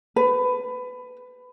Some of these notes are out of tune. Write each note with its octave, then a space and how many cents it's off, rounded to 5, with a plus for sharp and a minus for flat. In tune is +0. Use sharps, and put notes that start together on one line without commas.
B4 +20